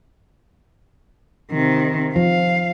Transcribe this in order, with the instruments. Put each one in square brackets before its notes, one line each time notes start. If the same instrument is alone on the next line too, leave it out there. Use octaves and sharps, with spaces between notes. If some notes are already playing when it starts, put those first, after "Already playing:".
[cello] C3 D#3
[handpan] F3 [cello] F5